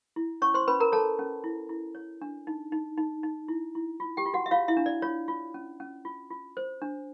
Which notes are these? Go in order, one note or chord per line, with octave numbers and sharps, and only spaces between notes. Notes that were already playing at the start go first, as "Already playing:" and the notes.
E4
C#4 C#5 C#6
C5 C6
C#4 B4 B5
A#4 A#5
A4 C#5 A5
C#4
E4
E4
C#5
D4
D#4
D#4
D#4
D#4
E4
E4
F4
G4 G5
F4
F#4 F#5
E5
F4 C#5 F5
E4 E5
D4
D5
F4 C#5
F4
C#4
C#4
F4
F4
C5
D4